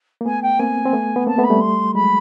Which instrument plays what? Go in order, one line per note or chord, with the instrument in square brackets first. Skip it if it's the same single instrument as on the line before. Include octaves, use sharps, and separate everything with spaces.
[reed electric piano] A#3
[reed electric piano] A3 B3 [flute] G#5
[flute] G5
[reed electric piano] A#3 C4 [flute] G#5
[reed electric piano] C4
A3 B3
B3
[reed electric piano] A#3 C4 [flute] A5
[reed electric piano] A3 B3
[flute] B5
[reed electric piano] G3 A3
[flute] C6
[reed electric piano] F#3 G#3 [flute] B5